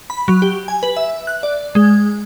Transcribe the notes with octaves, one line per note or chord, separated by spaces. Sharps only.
B5
F#3
G4
G#5
B4
E5
F#6
D5
G#3